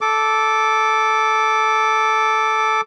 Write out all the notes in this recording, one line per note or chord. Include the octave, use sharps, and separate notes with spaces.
A4 D6